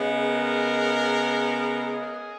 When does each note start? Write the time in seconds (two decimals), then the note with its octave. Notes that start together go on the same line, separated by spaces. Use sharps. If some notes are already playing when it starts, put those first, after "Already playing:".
Already playing: C#3 G#3 B3
0.10 A#4
1.81 G#4